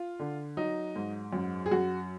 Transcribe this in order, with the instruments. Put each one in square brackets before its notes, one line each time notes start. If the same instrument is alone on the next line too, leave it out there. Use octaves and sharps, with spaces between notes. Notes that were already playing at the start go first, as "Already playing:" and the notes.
Already playing: [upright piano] F4
D3
F#3 D#4
G#2
F#2
G#4
F#2 F#4